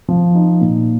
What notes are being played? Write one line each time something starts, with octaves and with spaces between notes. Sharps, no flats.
F3
D#4
A#2